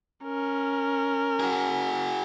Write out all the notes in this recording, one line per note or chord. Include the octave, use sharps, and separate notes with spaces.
C#4 A#4
F#4 G#4